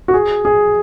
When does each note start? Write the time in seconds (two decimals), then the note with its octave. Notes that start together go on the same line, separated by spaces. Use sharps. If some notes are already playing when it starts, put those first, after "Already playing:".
0.08 F#4
0.14 G#4
0.45 G#4